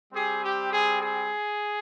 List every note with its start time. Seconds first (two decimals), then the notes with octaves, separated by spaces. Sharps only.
0.13 G3 C4 G4 G#4
0.42 G4
0.71 G#4
1.00 G#4